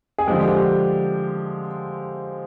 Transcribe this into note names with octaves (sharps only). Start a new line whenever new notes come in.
G#4
D3 F3 G#3 G4
G4
G4